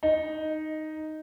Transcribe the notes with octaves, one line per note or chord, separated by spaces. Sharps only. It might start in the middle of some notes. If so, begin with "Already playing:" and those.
D#4